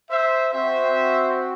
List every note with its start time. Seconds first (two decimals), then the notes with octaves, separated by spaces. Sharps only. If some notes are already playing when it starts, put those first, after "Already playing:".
0.11 C5 E5
0.53 C4 F#4 C5 E5